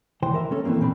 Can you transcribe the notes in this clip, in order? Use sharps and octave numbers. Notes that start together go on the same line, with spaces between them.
C#2 E3 C5 G5
A#4 E5
A3 C#4 A4
E3 F3 A3 A#3 C4
A#2 C4 D4 B5